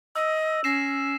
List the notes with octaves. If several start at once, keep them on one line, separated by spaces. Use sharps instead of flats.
D#5 E6
C#4 A#6 C7 E7